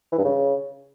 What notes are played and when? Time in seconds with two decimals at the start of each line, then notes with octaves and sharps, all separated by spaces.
0.12 E3
0.18 G2
0.25 C#3